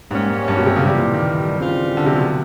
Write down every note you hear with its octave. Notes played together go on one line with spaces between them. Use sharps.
G#2 G3 A#3 C#4
G#2
G2
B2
C3
C#3
A2 C3 E3 G3
A#2
D#3
C#3 E3 G3 C4 F4
D3
C3
B2